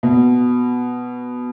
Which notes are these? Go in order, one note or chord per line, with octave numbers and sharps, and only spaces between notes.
B2